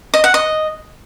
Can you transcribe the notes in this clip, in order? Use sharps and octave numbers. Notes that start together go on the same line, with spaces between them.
D#5
F#5
D#5